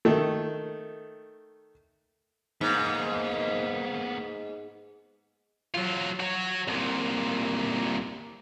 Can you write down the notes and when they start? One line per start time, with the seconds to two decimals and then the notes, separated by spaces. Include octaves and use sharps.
0.05 D#3 A3
2.61 G#2 A#3 B3
5.74 F#3 F4
6.20 F#4 C#5
6.68 C2 A#2